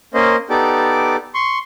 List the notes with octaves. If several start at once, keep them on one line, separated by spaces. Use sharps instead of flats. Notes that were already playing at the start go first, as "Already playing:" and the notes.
A#3 C#4 C5 D#5
B3 D#4 G4 A4 D5 D6
C6 C#6